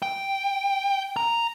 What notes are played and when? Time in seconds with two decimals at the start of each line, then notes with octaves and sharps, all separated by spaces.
0.02 G5
1.16 A#5